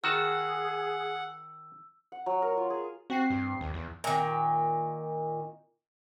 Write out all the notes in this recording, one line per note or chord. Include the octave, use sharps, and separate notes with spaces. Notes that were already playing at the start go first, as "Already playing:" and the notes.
D#3 F#4 G#4 F#5 A5 E6
F#5
F#3
A#4
F4
G#4
C4 F#4 G5 C7
G2
D#2
E2
A#2 D#3